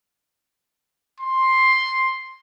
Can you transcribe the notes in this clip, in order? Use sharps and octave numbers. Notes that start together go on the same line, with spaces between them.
C6